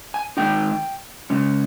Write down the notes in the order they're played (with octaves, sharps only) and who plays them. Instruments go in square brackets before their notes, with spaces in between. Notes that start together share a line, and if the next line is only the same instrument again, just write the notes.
[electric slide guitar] G#5
D#3 G#3 D#4 G5
C#3 G#3 C#4